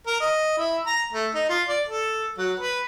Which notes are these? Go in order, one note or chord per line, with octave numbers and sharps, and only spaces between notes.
A#4
D#5
E4
A#5
A3
D#4
F4
D5
A4
F#3
B4